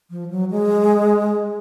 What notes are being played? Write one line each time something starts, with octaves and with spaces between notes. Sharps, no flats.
F3
F#3
G#3